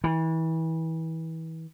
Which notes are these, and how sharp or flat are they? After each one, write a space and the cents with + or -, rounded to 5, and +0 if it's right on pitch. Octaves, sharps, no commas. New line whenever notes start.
E3 -30